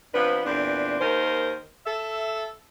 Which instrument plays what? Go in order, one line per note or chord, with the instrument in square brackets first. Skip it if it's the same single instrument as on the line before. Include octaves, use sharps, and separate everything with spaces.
[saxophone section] C3 F3 B3 D4 B4
E2 A#2 C4 D4
D#2 D#3 A#4 C5
A4 E5